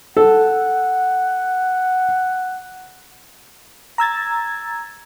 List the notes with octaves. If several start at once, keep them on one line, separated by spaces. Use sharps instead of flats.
A4 F#5
A#5 E6 G#6 A6